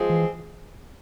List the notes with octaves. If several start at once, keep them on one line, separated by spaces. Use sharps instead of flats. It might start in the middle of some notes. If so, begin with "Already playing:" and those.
Already playing: F3 G#3 C4 G#4
E3